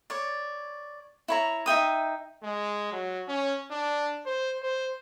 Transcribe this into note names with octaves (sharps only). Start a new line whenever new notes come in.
C#5 D5
E4 C#5 A#5
D#4 E5 G5 D#6
G#3
F#3
C#4
D4
C5
C5